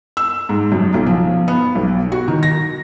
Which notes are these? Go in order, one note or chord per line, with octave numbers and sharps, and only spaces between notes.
E6
G#2
F#2
B1
F3
B3
B1
F#4
D#3
A#6